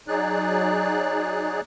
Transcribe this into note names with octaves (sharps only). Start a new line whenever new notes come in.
F#3 D#4 G#4 D5 F#6